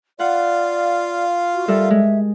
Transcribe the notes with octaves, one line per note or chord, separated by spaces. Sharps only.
F4 D5 F5 F#5
F#4
G3 A4 A#4 E5
G#3